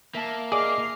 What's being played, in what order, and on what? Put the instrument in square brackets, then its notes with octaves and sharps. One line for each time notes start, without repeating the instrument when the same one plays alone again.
[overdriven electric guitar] A#3 [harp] E5 A5
[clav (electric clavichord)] G#4 D5 [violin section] D#5 F6 C7 [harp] D6